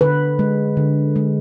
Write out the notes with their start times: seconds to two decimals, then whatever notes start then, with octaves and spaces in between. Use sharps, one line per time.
0.01 D3 B4
0.39 G#3
0.77 D3
1.16 G#3